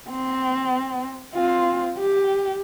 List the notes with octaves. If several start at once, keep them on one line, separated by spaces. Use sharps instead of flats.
C4
C4 F4
G4